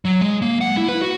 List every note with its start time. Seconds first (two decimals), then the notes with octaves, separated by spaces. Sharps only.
0.05 F#3
0.21 G#3
0.42 A#3
0.61 F#5
0.77 E4
0.88 B4
1.02 F#4